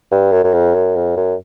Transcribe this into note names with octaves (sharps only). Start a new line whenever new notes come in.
G2
F#2
F#2
F2
F#2
F2
F#2